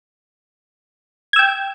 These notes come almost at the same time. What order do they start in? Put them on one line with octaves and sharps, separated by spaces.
G#6 E6 G5